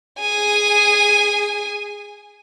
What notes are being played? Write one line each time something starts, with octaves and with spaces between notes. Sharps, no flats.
G#4 G#5